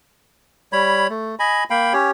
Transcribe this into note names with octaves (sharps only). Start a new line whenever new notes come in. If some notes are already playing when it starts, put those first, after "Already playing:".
G3 C#5 B5
A3
D#5 G#5 B5
A#3 F5 G5 B5
C#4 G4 C#5